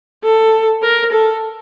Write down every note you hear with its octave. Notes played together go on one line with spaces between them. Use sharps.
A4
A#4
A4